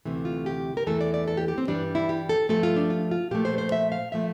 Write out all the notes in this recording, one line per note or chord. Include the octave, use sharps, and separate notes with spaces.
D2 C3 E3 A3
F4
G4
A#4
E2 E3 A3 A4
D5
D5
A4
G4
G4
C4
G2 E3 G3 D4
E4
G4
A4
G2 F3 A3 A4
F4
D4
F4
F4
A#2 F3 A3 G4
C5
C5
E5
F5
A#2 F3 A3 E5